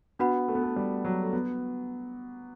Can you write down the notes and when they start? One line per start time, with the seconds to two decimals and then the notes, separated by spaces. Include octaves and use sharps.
0.19 B3 D4 F#4 B4 F#5 B5
0.48 A3
0.55 B3
0.63 A3
0.76 G3
1.05 F#3
1.23 A3
1.33 B3